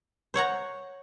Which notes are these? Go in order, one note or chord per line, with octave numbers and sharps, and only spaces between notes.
C5 C#5 F#5 A#5